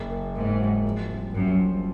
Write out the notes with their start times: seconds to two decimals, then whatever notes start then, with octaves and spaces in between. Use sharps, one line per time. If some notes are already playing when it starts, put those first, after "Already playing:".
Already playing: F#1 A#3
0.10 A#3
0.35 G#2 A#3
0.60 F#3
0.85 F3
1.09 C2
1.34 C2 F#2
1.59 F3